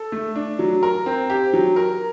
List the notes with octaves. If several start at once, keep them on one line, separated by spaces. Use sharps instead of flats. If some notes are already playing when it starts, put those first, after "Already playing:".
Already playing: A4
A3
D4
F#3
A#4
C4
G4
F#3
A#4